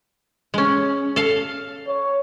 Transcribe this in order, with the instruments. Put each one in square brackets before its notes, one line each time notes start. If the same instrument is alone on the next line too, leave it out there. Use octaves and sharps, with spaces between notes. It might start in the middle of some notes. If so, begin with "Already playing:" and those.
[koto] G#3 C#4
A4 F5
[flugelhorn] C#5